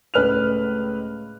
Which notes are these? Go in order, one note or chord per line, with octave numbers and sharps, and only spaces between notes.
C#2 A2 B4 F6 F#6 F7